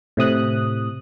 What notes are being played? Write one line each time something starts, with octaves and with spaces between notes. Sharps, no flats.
A2 C3 D#6 F#6